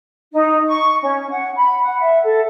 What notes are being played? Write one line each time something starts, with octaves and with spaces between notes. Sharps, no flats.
D#4
C#6
C#4
F#5
B5
F#5
E5
A4